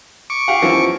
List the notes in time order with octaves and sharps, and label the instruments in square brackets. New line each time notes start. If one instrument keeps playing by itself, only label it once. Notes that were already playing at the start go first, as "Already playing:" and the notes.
[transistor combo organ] C#6 D6
[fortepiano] G4 F5 F#5
F#2 E3 F3